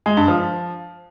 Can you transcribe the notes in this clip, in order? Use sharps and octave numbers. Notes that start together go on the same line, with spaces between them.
G#3
G2
F3